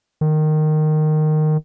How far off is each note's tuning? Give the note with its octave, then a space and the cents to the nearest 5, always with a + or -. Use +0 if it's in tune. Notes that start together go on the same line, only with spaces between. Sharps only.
D#3 -15